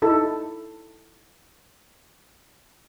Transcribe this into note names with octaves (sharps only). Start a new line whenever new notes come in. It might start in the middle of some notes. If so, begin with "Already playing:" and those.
D#4 E4 A4